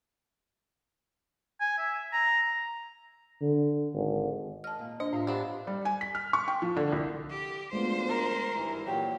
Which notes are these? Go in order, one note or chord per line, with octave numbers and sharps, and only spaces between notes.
G#5
E5
A#5
D3
G#1
D#5 A5 F6
A#2
D4 C5 D#5
A2 F4 A#4 E5 F5
B3 C4 D4 G4
G3
G#5
B6
F6
C#6
G5
F3
D3
C2
G4
F#2 G#3 A3 B3 D4 F4 C5
A#4
G#1 G2 E3
A#2 E3 F#3 G4